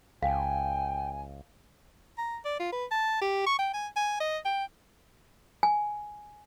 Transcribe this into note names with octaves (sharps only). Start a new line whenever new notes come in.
C#2 F5 G5 G#5
A#5
D5
F4
B4
A5
G4
C#6
G5
G#5
G#5
D#5
G5
G#5